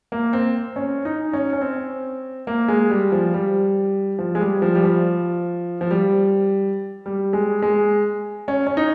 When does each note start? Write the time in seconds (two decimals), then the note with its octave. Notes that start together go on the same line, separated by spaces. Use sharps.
0.12 A#3
0.33 C4
0.76 C#4
1.05 D#4
1.33 C#4
1.53 C#4
1.61 C4
2.47 A#3
2.68 G#3
2.90 G3
3.12 F3
3.34 G3
4.19 F3
4.35 G#3
4.41 G3
4.62 F3
4.75 G3
4.84 F3
5.81 F3
5.91 G3
7.06 G3
7.33 G#3
7.62 G#3
8.48 C#4
8.67 C#4
8.77 D#4